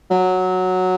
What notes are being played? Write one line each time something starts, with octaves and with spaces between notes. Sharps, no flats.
F#3